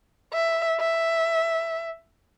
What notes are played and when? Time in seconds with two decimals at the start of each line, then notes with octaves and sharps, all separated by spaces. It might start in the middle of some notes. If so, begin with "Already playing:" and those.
0.33 E5
0.80 E5